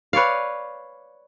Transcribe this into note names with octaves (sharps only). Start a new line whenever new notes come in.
B4 C#5 D5 F5